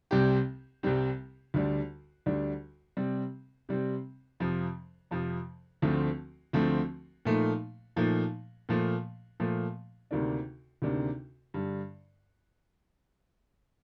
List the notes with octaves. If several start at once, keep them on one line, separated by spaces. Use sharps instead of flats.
C2 C3 G3 C4 G4
C2 C3 G3 C4 G4
D2 D3 G3 D4
D2 D3 G3 D4
C3 G3 C4
C3 G3 C4
F2 C3 F3
F2 C3 F3
D2 D3 F3 A3 C4
D2 D3 F3 A3 C4
A#2 F3 A3 D#4
A#2 F3 A3 D#4
A#2 F3 A3
A#2 F3 A3
D2 C3 D#3 A#3 D4
D2 C3 D#3 A#3 D4
G2 D3 G3